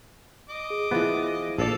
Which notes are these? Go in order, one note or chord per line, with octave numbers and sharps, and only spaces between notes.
D#5 D6
G#4
E3 F3 B3 G#4
A#1 A4 D5 F5